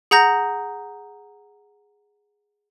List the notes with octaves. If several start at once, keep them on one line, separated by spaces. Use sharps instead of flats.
G#4 F#5 A#5 G6 A#6